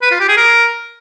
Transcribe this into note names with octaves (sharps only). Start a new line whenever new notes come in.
B4
F4
G4
G#4
A#4